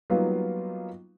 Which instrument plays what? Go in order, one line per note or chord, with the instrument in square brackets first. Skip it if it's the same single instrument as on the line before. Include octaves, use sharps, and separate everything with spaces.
[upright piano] F#3 G3 A#3 B3 D#4 F4